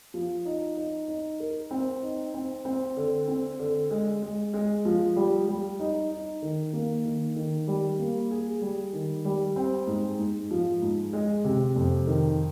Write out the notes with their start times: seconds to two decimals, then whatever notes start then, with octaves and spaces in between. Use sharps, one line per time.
0.14 F3
0.45 D#4
0.77 D#4
1.08 D#4
1.40 A#4
1.71 C4
2.03 D#4
2.34 C4
2.65 C4
2.97 D3
3.28 C4
3.59 D3
3.91 G#3
4.22 G#3
4.53 G#3
4.85 F3
5.16 G3
5.48 G3
5.79 D#4
6.11 D#4
6.42 D#3
6.73 A#3
7.05 D#3
7.36 D#3
7.68 G3
7.99 A#3
8.31 G#4
8.62 G3
8.93 D#3
9.25 G3
9.56 C4
9.87 G#2
10.19 G#2
10.51 F3
10.82 G#2
11.13 G#3
11.45 C3
11.76 F2
12.07 D#3